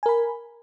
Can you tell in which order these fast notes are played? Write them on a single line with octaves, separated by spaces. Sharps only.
G#5 A#4 B5